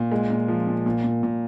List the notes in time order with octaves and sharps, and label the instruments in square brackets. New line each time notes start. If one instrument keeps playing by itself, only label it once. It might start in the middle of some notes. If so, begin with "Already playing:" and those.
Already playing: [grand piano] A#2
G#3
A#2
F3
A#2
A#2
A#2
A#2